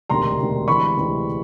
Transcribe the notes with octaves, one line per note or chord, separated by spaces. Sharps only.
E1 D2 C3 D#3 A#5 C6
E1 D2 C3 D#3
D2 C3 E3 G#3 B5 C#6
D2 C3 E3 G#3